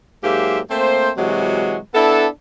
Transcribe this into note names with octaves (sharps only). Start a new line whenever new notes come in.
G#2 F#3 A#3 G4 C5 E5
A3 A#3 C4 C5
C3 E3 F#3 G#3 F#4
B3 D4 E4 A4